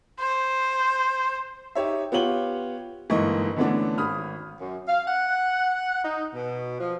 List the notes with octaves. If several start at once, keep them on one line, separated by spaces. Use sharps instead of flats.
C5
D#4 G4 C#5 E5
B3 F4 G4 C#5 F#7 G7
G1 G#2 E3 A#3 D#5 C#6
D3 E3 A3 B3 C#4 D4
G#1 B5 D#6 F6
F#2
F5
F#5
D#4
B2
F3